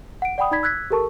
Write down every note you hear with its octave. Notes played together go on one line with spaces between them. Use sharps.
F#5 D7
D5 F#5 G5 B5 D#6
D#4 D5 B5 G#6 B6
E6 F#6 G#6 B6
G4 A4 A#4 A5 C#6